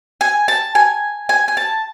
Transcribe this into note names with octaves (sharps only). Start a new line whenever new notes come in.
G#5
A5
G#5
G#5
G#5
A5